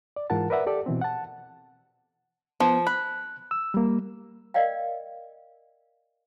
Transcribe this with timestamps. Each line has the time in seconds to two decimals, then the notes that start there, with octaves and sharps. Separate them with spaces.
0.16 D5
0.30 G#2 E3 F4 A#4 F#5 A5
0.50 A#4 B4 D5 E5 F#5
0.66 G4 A4 D5
0.86 B2 E3 C4
1.01 F#5 A5
2.60 F3 B3
2.87 B5 F#6
3.51 E6
3.74 G3 A#3
4.54 A#4 D5 D#5 F5 G5